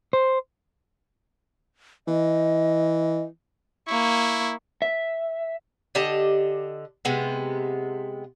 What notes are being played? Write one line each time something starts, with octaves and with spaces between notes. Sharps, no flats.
C5
E3 D#5
A#3 E4 C#6
E5
D3 G4 D#5 A5
C3 G#3 B3